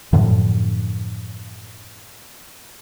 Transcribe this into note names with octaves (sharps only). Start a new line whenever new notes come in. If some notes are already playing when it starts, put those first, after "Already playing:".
F#2 A2 D3 F3